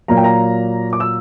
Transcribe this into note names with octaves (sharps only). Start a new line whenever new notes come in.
A#2 F#3 A#3 A#5
G5
A#5
D6
E6